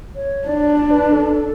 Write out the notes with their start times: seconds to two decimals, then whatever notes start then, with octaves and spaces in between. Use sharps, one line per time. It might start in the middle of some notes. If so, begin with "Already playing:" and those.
0.16 C#5
0.47 D4 D5
0.70 D5
0.91 B4
1.12 A4